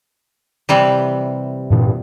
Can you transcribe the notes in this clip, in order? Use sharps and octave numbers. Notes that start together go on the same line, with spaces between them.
C3 E3 G3
G2 A#2 E3